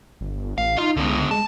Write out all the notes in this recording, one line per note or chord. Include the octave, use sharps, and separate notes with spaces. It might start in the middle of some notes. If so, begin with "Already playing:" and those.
G1
A1 F5
D#4 F4
C#2 D3 B3
G#3 A5